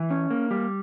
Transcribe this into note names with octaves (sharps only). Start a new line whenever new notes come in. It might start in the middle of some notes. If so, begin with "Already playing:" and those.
Already playing: E3
C#4
A#3
G3